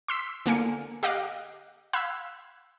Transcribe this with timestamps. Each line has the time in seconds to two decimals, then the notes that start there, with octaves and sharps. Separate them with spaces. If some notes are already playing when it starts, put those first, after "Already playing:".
0.08 C6 E6 B6
0.46 D3 A#3 G#5 C#7
1.03 G4 D#5 F5 D6 F#6
1.93 F5 B5 E6 F#6 G#6